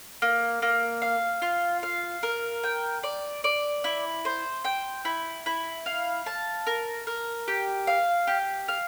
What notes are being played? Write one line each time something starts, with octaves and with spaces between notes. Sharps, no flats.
A#3
A#3
F5
F4
F5
A#4
G5
D5
D5
E4
C5
G5
E4
E4
F5
A5
A#4
A#4
G4
F5
G4
F5